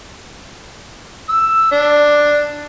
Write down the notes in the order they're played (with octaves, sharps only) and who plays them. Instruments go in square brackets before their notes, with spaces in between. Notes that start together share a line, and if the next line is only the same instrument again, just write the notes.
[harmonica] E6
D4